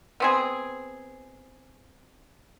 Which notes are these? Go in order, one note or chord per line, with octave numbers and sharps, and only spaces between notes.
B3 C4 G#4